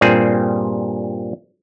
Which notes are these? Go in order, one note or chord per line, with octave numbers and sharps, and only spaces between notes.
G2 A#2 G3 C4 G#4